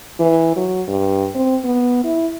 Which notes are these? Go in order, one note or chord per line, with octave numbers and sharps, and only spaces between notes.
E3
F#3
G2
C4
B3
E4